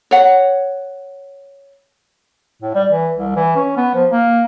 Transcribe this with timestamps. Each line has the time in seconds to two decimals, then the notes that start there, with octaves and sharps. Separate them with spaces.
0.11 C#5 F#5
2.62 A2
2.75 G3
2.90 E3
3.16 C2
3.36 E3
3.56 C#4
3.77 B3
3.94 F3
4.11 A#3